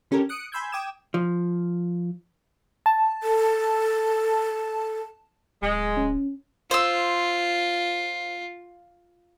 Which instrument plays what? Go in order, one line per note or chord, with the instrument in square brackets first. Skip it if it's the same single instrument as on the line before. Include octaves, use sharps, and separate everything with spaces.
[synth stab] D3 C#4 G4 A4 A#4
D#6 F#6 C#7 D7
G#5 B5 C6 E6 G6 G#6
G5 D6 D#6 G#6 E7
[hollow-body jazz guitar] F3
[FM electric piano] A5
[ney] A4
[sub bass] D1 [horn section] G#3
[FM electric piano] C#4
[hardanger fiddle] F4 [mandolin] C5 E6